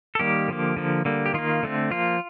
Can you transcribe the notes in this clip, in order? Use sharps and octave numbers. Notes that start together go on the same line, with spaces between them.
A4
D#3 G3 A#3 G4
D3 F3 A#3
D3 F3 A#3
D3 G3 A#3
G4
D#3 A#3 F4
D3 A3 C4
F3 A#3 F4